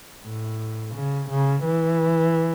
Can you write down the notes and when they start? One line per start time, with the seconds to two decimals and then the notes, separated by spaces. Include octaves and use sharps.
0.23 A2
0.95 C#3
1.29 C#3
1.65 E3